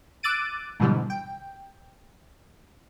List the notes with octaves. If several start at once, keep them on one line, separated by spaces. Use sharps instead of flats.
D6 E6 F#6 A6 D7 D#7
G#2 B2 D3 E3 F#3 G3
G5